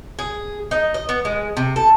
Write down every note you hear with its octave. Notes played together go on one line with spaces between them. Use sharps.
G#4
D#4
D#5
B3
G#3
C3
A4